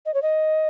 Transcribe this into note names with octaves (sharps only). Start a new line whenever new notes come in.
D#5
C#5
D#5